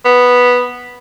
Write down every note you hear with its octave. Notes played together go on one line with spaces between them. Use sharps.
B3